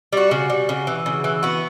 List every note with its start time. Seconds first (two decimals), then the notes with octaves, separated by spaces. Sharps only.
0.13 G3 F#4
0.31 C#3
0.50 G3
0.69 C#3
0.87 E3
1.06 C#3
1.24 E3
1.43 B3 F#4